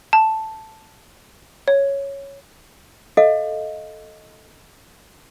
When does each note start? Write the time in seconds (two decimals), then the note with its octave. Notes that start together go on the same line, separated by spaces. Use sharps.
0.13 A5
1.68 C#5
3.17 A4 D#5 F5